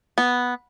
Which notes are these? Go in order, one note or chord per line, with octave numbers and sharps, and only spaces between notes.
B3